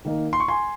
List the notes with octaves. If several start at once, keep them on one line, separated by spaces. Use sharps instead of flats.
D#3 A#3 D#4
C6
C#6
G#5 C6